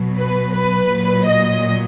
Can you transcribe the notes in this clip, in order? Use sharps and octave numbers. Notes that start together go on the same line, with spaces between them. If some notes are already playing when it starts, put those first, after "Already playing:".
Already playing: B2 F#3
B4
B4
A#2 F#3
D#5